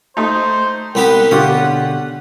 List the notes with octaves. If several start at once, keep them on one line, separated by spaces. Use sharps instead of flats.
A3 D#4 C5
C2 B3 G4 F#5
B2 D3 C#4 F4 G4 D#6